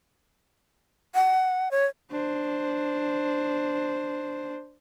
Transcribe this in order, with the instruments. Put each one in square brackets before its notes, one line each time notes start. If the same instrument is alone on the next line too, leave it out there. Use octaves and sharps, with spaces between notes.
[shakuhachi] F#5
C#5
[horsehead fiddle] D4 C5